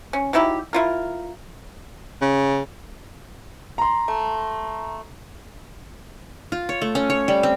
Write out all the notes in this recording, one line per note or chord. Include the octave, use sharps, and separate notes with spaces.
C#4
F#3 D#4 E4 G4
E4 F4 A#4
C#3
A#5 C6
A3
F4
C#5
A3
C#4
C#5
G3
C4